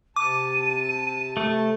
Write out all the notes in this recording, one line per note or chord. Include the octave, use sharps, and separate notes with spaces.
C3 A5 D6 D#7
A3